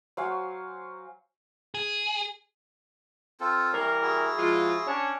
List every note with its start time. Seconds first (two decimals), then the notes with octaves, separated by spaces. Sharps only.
0.17 F#3 C5 F5 G#5
1.75 G#4
3.40 C4 F4 A4
3.73 E3 G3 A#4 C#5 F5
4.02 E4 F#4 G#4
4.38 F3 G#3 F4
4.87 C#4 D4 C#5